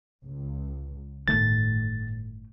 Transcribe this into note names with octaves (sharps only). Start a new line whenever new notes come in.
C#2
G1 A2 D#3 A3 A6